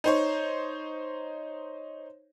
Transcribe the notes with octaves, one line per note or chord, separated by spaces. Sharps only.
D#4 C5 C#5